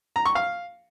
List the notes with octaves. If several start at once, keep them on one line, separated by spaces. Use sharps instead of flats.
A#5
C#6
F5